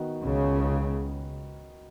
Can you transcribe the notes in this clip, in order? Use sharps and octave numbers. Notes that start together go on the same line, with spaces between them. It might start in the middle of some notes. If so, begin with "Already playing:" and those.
Already playing: D#3 B3 F#4
C#2 C#3